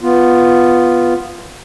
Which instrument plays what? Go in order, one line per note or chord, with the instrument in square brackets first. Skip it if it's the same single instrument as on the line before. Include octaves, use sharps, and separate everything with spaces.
[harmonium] B3 F4